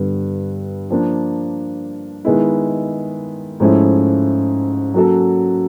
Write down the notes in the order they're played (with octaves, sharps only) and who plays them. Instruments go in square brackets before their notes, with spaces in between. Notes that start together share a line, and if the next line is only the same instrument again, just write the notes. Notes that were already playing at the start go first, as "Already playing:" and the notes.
Already playing: [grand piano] G2 D3 G3 B3
F3 A#3 D4
D#3 G#3 B3 E4
G#2 F3 A3 C#4 E4
F#3 A#3 C#4 F#4 A4